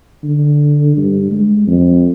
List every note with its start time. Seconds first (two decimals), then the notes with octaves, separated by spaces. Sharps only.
0.24 D3
0.97 G2
1.31 G#3
1.67 F2